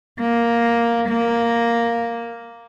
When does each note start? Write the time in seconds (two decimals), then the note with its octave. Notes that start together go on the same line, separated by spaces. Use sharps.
0.20 A#3
1.09 A#3